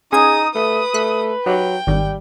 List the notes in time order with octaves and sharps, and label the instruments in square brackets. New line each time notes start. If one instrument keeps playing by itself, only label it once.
[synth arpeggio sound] C#4 G#6 [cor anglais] D#4 [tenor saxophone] G#4 [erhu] D#6
[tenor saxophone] A3 [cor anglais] B4 [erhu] D#6
[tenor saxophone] A3 [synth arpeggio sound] F#6 B6
[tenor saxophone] F#3 [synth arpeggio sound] D#4 G4 [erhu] G5
[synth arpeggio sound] G#1 D#3 [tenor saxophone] G3